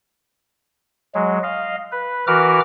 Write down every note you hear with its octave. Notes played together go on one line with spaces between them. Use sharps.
F#3 G#3
D#5 F5
B4
E3 F#4 A#4 B4 D6 F6